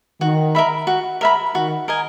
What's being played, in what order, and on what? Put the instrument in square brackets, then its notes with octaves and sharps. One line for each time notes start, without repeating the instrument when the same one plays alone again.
[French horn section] D#3 [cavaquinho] F#4
[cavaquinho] A#4 E5 B5
F#4
A#4 E5 B5
[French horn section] D#3 [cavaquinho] F#4
[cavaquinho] A#4 D#5 G#5